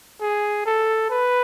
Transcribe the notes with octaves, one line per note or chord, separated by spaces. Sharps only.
G#4
A4
B4